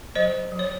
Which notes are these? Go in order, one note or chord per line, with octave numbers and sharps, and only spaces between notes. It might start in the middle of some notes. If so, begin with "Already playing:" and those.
F#3 C5 D#5
F#3
C#5